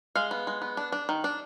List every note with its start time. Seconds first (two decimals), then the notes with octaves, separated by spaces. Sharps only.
0.15 G#3 F5
0.31 B3
0.47 G#3
0.62 B3
0.77 D4
0.92 D4
1.09 D#3
1.24 D4